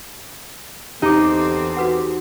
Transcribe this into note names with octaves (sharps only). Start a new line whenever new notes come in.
E2 D3 C4 D#4 G4 D6
F#4 B4 F#5